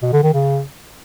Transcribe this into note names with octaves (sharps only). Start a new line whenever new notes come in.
B2
D3
D#3
C#3